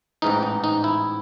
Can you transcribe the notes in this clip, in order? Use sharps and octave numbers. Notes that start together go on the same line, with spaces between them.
A1 G#2 E3 D#4
D#4
D#4
E4